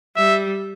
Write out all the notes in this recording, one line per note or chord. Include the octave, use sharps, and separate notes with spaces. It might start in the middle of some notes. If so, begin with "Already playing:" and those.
G3 E5